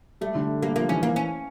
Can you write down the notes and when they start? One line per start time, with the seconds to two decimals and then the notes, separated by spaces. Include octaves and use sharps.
0.21 G3 A3
0.35 D3
0.62 G3 A#3
0.76 F3 A#3
0.89 E3 C#4
1.03 A#3
1.16 C#4